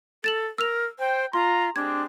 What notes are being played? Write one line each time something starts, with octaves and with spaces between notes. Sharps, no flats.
A4 A6 E7 F#7
A#4 E6 F6 F7
C5 G5
F4 A#5 C6
G#3 C4 D4 G4 G#6